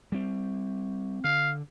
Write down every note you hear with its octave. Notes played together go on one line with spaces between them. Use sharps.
G3 C4
D3 F5